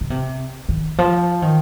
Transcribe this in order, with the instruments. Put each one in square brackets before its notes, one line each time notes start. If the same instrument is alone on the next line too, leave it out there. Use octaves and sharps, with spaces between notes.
[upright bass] C#3
C3
D#3
F3
D#3